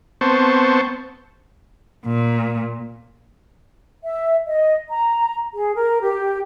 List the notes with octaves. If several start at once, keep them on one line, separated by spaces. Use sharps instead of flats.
B3 C4 C5 A5 C#6
A#2
E5
D#5
A#5
G#4
A#4
G4